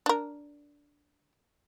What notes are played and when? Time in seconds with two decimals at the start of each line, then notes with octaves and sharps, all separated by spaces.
0.06 D4 A#4